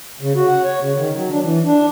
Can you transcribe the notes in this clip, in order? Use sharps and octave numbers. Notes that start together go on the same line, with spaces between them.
C#3
F#4
F#5
C#5
C#3
D#3
F#3
D4
E3
D4